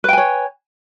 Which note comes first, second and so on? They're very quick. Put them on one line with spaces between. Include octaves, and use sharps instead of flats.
B4 G5 G#5 C#5